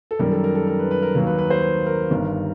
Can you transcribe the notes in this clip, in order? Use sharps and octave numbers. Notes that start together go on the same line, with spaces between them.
A4
F#2 D#3 G3 A#4
A4
A#4
A4
A#4
B4
B4
A#4
D#2 D#3 F#3 A#3 A#4
B4
B4
C5
B4
A#4
G1 G2 D#3